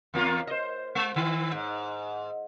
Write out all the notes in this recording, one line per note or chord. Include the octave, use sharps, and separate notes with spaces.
E2 A#3 F4
C5 D#5
G#3
D#3
G#2